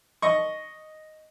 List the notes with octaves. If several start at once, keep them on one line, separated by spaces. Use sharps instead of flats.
D#5 C#6